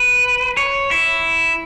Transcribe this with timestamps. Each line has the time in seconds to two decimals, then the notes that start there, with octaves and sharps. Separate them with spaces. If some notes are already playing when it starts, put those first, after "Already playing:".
Already playing: B4
0.57 C#5
0.91 E4